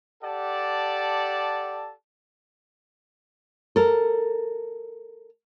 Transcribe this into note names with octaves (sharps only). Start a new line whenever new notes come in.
G4 A4 D5 F#5 A5
A4 A#4